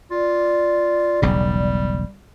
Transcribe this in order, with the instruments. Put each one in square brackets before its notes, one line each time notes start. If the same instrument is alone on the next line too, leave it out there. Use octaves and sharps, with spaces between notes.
[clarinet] F4 [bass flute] D5
[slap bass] E1 B1 C#3 [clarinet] G3